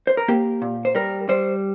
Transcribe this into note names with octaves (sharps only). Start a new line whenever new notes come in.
C5
A#4
A#3 G4
A#2
C5
G3 A#4
G3 C5